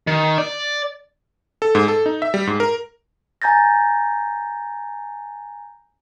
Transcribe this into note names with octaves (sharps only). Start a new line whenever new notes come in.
D#3
D5
A4
G#2
A4
D#4
E5
G3
G#2
A#4
G#5 A#5 G6 A6 A#6